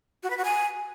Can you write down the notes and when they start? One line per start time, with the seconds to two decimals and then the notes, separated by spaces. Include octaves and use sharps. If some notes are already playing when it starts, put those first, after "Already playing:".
0.23 F#4
0.30 B4
0.37 F#4
0.45 G#5